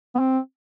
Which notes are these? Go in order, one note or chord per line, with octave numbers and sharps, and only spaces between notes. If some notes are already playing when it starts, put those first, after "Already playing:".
B3
C4